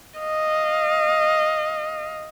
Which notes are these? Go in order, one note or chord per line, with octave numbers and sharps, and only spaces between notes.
D#5 F5